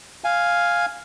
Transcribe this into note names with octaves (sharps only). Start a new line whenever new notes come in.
F5 G#5